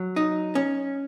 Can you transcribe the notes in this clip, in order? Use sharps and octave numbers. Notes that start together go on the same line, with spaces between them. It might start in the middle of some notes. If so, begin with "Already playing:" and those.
Already playing: F#3
D#4
C#4